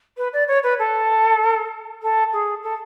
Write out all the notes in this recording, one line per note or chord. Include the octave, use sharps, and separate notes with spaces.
B4
D5
C#5
B4
A4
A4
G#4
A4